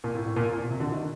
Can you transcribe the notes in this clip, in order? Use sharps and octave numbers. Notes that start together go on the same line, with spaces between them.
A#2
A2
A2
A#2
A#2
C3
D3
D#3